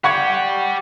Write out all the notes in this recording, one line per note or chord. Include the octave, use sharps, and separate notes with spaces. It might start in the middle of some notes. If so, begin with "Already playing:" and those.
G4 D5 F#5 C#6 G#6